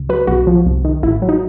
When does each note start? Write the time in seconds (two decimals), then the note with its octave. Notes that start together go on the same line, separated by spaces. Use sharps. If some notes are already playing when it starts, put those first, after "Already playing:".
Already playing: C#2
0.09 F#3 B4
0.27 B1 F#4
0.47 F3
0.66 C2
0.85 D#3
1.03 A1 E4
1.22 F#3
1.29 D#4